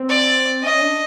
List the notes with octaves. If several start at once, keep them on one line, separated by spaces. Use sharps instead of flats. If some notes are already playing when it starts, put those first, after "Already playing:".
Already playing: C4
D5
C#4 D#5
D4